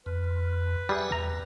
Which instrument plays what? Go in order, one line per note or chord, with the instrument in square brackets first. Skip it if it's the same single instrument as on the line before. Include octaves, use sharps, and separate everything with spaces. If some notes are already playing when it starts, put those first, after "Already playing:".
[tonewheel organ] F2 [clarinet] B4
[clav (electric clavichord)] G3 G#4 [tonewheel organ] E5 F#5
[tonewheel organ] E2 [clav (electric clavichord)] A#5